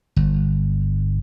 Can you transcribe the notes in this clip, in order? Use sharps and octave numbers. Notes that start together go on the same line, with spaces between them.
G1